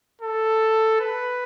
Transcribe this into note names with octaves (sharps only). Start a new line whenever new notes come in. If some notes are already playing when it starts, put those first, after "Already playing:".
A4
B4